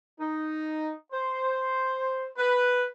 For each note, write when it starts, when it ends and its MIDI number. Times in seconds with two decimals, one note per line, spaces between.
0.20 0.90 63
1.13 2.25 72
2.37 2.84 71